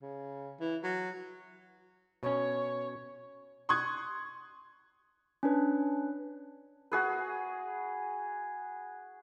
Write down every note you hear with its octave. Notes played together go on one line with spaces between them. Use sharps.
C#3
E3
F#3
B2 C#4 C#5
C6 C#6 D#6 F#6 G#6
C#4 D4 B4
F#4 G#4 B4